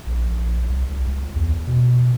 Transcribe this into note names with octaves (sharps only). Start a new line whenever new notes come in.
A#1
C2
C#2
E2
B2